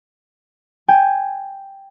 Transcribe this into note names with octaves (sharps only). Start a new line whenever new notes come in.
G5 G#5